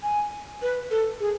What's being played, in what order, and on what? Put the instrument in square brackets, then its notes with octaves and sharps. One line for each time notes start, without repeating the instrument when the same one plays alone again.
[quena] G#5
B4
A4
G#4